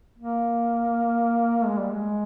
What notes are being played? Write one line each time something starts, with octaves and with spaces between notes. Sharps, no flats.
A#3
G#3
G3
G#3